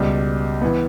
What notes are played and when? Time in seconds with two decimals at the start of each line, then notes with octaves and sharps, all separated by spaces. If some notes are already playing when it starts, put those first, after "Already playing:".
Already playing: C#2 B2 G3
0.61 E3 B3